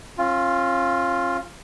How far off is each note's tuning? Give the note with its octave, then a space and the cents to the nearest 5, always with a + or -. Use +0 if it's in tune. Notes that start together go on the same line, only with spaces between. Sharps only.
C#4 -40 F4 +0